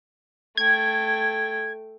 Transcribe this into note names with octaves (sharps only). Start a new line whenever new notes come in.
A3 G5 G#6